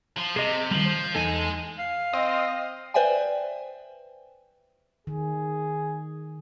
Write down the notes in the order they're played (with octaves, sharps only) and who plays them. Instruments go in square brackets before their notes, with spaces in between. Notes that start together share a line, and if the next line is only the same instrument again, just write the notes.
[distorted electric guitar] F3
[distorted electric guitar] C3 [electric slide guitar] G#4 D#5
[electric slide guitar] D#3 G3 [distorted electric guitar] F3
[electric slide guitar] C5
[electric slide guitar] E2 D#4 A4 [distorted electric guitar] G#3 G#5
[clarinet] F5
[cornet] C4 [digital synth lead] D#5
[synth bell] B4 C5 D5 E5 G5 G#5
[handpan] D#3 [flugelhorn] G#4